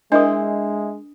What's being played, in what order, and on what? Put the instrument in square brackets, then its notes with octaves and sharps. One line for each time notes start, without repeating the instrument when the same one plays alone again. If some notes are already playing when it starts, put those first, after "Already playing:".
[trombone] G#3 [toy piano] D4 D#6 [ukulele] E4 C5 [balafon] A#4 D#5